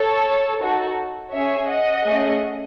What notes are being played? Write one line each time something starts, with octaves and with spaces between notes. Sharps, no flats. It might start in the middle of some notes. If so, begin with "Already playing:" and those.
Already playing: A4 C#5
D#4 F#4 A4
C#4 G#4 C#5 E5
D#5 F#5
A3 C#4 G#4